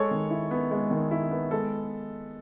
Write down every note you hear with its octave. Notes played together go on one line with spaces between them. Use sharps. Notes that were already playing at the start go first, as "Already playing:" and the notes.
Already playing: G#3 A4 C#5
D#3
E4
B3
G#3
D#3
E4
B3
G#3 A4